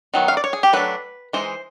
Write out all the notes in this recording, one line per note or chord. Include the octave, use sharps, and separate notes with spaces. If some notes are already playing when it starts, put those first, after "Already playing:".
D#3 F#3 B3
F5
D5
C#5
G#4
G4
F#3 A3 D4 B4
E3 G#3 D#4 C5